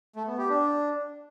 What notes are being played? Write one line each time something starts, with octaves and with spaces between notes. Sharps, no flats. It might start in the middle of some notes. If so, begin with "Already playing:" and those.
A3
B3
G4
D4